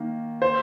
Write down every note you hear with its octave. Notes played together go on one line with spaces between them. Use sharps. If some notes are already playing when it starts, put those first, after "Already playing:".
Already playing: D#3 A#3
C5